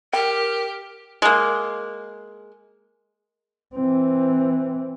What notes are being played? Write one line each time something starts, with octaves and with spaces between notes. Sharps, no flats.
G4 A#4 G5
G#3 A#3
E3 C4